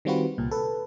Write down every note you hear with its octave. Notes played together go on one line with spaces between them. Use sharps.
D#3 G3 C4 F4 F#4 B4
C2 A#2
A4 B4